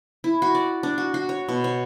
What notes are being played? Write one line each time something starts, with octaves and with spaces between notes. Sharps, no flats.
E4
F#4
D5
D4
F#4
F#4
C#5
B2
C#5